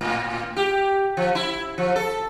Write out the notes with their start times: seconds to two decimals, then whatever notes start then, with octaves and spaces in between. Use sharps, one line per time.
0.01 A2
0.56 G4
1.17 F3
1.35 E4
1.78 F3
1.96 A4